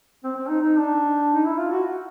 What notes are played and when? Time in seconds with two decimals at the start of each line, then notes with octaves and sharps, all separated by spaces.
0.24 C4
0.36 C4
0.49 D#4
0.60 D#4
0.79 D4
1.34 D#4
1.46 E4
1.58 F4
1.71 F#4